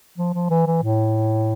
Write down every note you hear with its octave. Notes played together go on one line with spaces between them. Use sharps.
F3
F3
E3
E3
A2